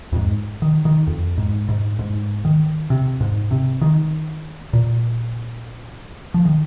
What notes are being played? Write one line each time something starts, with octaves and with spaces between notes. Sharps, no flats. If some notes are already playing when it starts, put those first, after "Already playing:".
F2
G#2
D#3
D#3
F2
G#2
G#2
G#2
D#3
C3
G#2
C3
D#3
A#2
F3
D#3